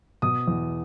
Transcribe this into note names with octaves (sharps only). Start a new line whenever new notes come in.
B2 D#6
E2